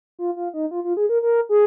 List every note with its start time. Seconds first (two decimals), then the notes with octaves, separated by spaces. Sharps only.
0.19 F4
0.36 F4
0.54 D#4
0.71 F4
0.84 F4
0.97 G#4
1.09 A#4
1.22 A#4
1.49 G#4